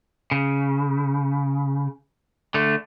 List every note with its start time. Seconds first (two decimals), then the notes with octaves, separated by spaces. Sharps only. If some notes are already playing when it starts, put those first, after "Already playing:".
0.31 C#3
2.54 D3 A3